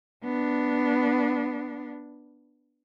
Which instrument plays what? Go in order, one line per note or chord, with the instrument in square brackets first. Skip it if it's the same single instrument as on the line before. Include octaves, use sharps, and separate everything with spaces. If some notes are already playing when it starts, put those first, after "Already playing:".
[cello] B3 D4